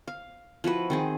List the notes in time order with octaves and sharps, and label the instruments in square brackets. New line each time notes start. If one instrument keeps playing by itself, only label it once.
[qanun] F5
F3 E4 F#4 B4
D#3 C4 G#4